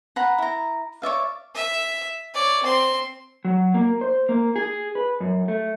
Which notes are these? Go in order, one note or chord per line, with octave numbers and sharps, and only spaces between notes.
F#5 A#5 B5
E4 A#5
C#5 D5 E5 F5
E5
C#5 D5
C4 C6
F#3
A#3
C5
A#3
G#4
B4
F#2
A3